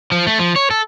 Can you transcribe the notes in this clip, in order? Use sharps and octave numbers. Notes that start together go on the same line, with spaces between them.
F3
A3
F3
C#5
A4